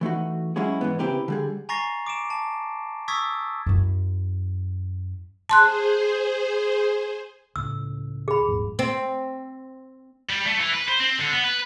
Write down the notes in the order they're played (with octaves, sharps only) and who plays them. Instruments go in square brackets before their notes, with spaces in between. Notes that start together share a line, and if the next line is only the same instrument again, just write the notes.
[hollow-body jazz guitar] E3 A3 D#4 F#4
F#3 G#3 C#4 E4 F#4 G#4
G#2 E3 B3
C#3 C4 E4 G4 A#4 B4
D3 G3 G#4
[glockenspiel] G#5 A#5 C#6 A6 A#6 C7
D6 D7 E7
A5
C#6 D#6 E6 G#6 A6 B6
[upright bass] F#2 E4
[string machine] G#4 C5 [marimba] A5 C6 F#6
[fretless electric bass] C#2 A2 [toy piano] E6
[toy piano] G#4 B5
[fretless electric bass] D#1 G#2 F3
[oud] C4
[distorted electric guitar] G3
A3
E3
B4
C5
C4
D3
B3
B4